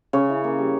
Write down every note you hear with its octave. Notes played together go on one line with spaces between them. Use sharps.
C#3 C#5
E3
A#3
G3